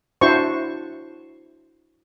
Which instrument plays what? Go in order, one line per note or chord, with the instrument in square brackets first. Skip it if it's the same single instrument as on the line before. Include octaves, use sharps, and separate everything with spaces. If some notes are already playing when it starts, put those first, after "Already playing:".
[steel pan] D4 E4 F#4 C5 C#6